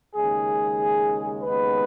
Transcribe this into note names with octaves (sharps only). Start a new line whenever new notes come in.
D#2 C#3 G#3 G#4
D#2 C#3 G#3 B3 B4